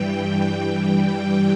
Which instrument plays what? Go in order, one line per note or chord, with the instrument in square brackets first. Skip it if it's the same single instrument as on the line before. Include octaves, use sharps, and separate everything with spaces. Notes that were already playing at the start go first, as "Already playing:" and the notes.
Already playing: [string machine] G2 E3 G3 G5
G5
G5
G5